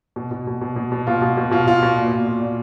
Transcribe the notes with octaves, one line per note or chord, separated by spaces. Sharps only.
B2
B2
B2
B2
B2
B2
B2 F4
B2
B2
B2 F4
B2 F4
B2
A#2
A#2
A#2
A#2